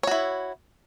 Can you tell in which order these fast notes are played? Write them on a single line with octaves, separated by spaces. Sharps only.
C#5 F#4 E4